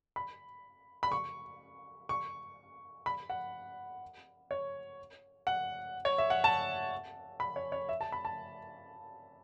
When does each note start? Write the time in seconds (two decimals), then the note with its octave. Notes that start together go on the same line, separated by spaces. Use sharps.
0.16 B5
1.03 B5
1.12 C#6
2.09 C#6
3.06 B5
3.30 F#5
4.51 C#5
5.47 F#5
6.05 C#5
6.18 E5
6.30 F#5
6.44 A5
7.40 B5
7.56 C#5
7.72 C#5
7.89 E5
8.01 A5
8.12 B5
8.25 A5